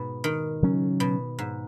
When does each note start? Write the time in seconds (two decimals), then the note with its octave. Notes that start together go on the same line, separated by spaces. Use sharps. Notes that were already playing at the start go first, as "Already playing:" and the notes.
Already playing: G#2 B2
0.24 D#3
0.62 C#3 F#3 C#4
1.00 B2
1.39 G#2